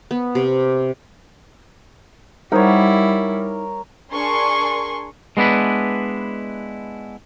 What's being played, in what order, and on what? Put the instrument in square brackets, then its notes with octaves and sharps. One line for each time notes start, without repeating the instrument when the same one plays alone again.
[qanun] B3
C3
[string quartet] G3 E4 [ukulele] D#4 C5 F#5 [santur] A#4 C#5
[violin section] D4 G#4 A#4 G#5 C6 C#6
[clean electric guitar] G#3 B3 D4 E4 B4